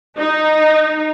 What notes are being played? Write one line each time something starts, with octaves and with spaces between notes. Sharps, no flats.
D#4